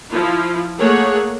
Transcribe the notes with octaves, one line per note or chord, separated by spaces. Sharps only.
F3 E4 F4
A3 A#3 G#4 C#5 F#5